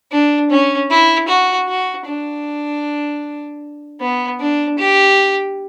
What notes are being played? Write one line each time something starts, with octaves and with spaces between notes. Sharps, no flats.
D4
C#4
E4
F#4
F#4
D4
B3
D4
G4